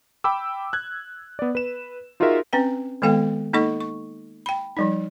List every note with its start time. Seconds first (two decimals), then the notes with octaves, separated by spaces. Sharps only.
0.24 G5 B5 D6 E6
0.73 F#6 G#6
1.39 B3 D5
1.55 B4 E7
2.20 D#4 F4 F#4 G#4 A#4 E5
2.53 C4 C#4 B4 G5
3.02 D#3 G#3 B3 A4 F5 G5
3.53 A#3 D#4 A4 D#5 C#6
3.80 C#6
4.46 G5 B5
4.77 F3 G3 D#4